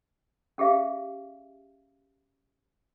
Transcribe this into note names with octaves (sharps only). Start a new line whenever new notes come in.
C#4 G4 G#4 E5 F5